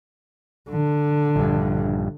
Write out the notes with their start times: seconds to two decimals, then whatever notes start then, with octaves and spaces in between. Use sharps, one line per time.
0.70 D3
1.36 A#1 G2